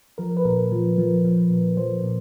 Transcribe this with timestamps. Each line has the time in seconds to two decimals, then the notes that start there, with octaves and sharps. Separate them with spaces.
0.18 F3 A#4
0.37 B4
0.45 A#2 A#4
0.72 F3
0.98 F3
1.25 F3
1.50 A#2
1.77 F3 C5
2.04 A#2